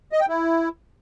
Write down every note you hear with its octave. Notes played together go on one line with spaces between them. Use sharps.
D#5
G5
E4